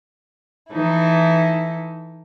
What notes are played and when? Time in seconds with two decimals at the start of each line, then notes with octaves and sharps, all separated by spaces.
0.72 E3 D#4 E4 A4